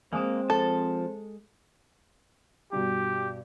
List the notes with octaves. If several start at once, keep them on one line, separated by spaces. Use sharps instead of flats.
G#3 A#3 C4 C5 D6 E7
F3 A4 A5
G2 B2 G4